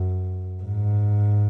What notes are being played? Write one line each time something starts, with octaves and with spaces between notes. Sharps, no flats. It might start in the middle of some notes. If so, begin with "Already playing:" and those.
Already playing: F#2
G#2